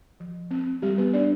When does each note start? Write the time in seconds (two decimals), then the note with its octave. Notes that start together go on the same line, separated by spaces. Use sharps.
0.20 F3
0.51 C4
0.82 G3 G4
0.98 B3 B4
1.13 B3 D4 D5